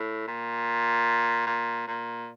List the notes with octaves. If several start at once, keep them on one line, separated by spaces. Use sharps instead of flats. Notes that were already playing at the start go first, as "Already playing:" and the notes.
Already playing: A2
A#2
A#2
A#2